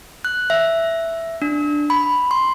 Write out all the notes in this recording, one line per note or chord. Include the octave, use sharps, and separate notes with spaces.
F#6
E5
D4
B5
C6